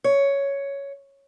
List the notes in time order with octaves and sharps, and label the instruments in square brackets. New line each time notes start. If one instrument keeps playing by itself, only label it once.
[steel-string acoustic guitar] C#5